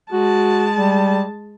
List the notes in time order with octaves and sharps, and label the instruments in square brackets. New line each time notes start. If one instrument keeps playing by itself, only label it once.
[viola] G#3 A5 [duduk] F#4
[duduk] G3